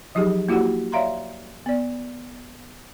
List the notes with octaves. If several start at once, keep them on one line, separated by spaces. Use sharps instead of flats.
F3 F#3 D#4 G4 G#4
A#3 E4 F#4 G4 F#5
C#5 D5 E5 F5 A#5 C6
B3 D5